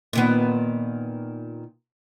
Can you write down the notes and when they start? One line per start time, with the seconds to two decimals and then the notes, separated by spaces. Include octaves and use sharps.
0.13 A#2 D#3 B3